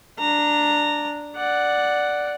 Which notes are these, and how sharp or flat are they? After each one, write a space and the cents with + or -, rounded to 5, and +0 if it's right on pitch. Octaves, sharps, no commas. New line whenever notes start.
D4 +0 A#5 -15
D5 +0 F#5 +0